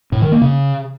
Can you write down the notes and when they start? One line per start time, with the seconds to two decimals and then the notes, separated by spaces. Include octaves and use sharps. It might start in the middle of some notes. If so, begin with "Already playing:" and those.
0.12 A2
0.22 D#3
0.32 A#3
0.42 C#3